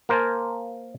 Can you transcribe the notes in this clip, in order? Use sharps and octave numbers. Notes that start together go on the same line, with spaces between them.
A#3 A#4 C5 F5 G#5 A5